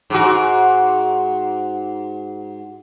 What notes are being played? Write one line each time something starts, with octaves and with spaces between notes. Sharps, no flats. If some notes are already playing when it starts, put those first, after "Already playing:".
G#2 F#4